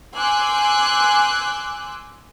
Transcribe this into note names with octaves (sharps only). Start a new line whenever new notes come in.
G#5 C6 D6 E6 F#6 G6